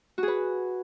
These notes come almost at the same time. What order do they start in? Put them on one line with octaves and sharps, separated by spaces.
F#4 G#4 B4